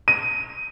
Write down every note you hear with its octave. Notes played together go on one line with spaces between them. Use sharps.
D#7